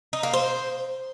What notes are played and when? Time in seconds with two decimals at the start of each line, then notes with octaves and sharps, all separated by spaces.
0.13 D#4
0.23 A#3
0.34 C5